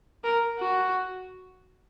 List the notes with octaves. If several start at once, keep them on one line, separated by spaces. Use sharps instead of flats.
A#4
F#4